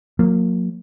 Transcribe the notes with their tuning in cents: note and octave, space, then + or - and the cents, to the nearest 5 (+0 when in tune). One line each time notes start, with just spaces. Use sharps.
F#3 -35 A#3 -10